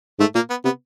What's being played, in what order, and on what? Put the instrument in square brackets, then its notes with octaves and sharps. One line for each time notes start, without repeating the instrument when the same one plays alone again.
[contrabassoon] G#2 [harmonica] A3
[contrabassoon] A#2 [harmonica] A#3
[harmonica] B3
[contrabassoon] C3 [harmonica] B3